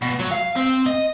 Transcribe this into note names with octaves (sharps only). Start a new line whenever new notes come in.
B2
F#3
F5
C4
D#5